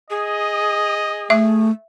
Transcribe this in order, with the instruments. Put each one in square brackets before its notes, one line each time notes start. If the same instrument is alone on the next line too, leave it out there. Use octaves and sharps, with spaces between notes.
[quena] G#4 [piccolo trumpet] D#5
[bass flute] A3 [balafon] E5